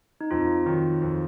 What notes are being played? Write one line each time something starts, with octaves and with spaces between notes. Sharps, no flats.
D#4
F2 F4
D#3 F#3
F2